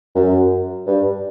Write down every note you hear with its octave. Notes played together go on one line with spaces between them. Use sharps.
F#2
G2